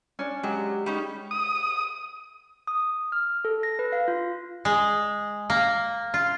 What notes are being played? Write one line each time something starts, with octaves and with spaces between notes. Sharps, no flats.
C#4 D4
F#3 G#3 G4
G3 C#4 D#4
D#6
D#6
F6
A4
A#6
B4
F5
F4
G#3
A#3
F4